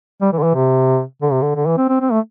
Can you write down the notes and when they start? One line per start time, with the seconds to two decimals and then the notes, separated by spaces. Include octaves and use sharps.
0.21 G3
0.32 E3
0.39 D3
0.43 E3
0.55 C3
1.22 D3
1.32 C3
1.42 D3
1.56 D3
1.66 E3
1.77 C4
1.89 C4
2.01 C4
2.12 A3